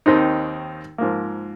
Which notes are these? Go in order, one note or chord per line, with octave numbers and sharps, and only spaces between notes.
D#2 D#3 C4 D#4
G#2 F3 A#3